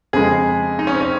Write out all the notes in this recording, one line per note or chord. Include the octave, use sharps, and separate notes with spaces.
F2 C#3 G#3 G#4
D#4
C#4
C4
C#4